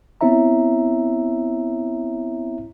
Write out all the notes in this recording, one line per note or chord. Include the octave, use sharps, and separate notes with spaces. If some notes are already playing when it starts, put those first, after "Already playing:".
B3 C4 E4 C#5 E5 A#5